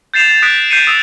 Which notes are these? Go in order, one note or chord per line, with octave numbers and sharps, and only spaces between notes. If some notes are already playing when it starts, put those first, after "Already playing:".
G6 A6 C7 E7 F7
A6
D#6 F#6 B6 D7
G6 C7 C#7 D#7
D#6 E6 F7